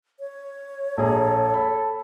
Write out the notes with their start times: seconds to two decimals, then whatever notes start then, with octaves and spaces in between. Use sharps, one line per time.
0.20 C#5
0.97 A#1 G#4 A4 A#5
1.54 B5